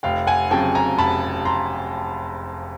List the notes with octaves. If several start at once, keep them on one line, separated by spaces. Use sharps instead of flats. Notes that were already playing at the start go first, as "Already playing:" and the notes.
F1 F5 G5
F#5 G#5
F2 C#3 F#3 G5 A5
G#5 A#5
F1 A5 B5
A#5 C6